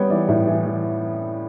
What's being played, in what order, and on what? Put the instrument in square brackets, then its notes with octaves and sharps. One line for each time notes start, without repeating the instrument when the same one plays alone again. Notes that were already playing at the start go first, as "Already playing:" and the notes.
Already playing: [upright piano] G3 B3 C#5 G5
E3 D5
A2
E3
E3